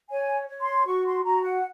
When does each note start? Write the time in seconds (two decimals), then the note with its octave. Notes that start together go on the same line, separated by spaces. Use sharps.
0.10 C#5 G#5
0.48 C#5
0.61 C6
0.85 F#4 C#6
1.05 C6
1.23 F#4 A#5
1.43 F#5